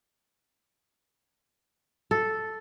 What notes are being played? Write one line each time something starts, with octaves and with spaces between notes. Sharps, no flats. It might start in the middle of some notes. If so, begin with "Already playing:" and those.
A4